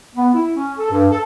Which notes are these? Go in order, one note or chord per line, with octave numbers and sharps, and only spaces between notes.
B3
E4
C#4
A4
G2
A4